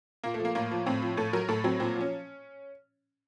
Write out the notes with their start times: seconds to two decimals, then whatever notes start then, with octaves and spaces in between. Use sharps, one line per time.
0.24 A#2 A#3
0.34 A3
0.40 F3
0.45 A#3
0.55 A2 A#3
0.71 F3
0.86 A2 C4
1.02 F3
1.17 A2 A4
1.33 F#3 A#4
1.48 A2 A4
1.64 F#3 C4
1.80 A#2 C4
1.96 F3
2.01 C#4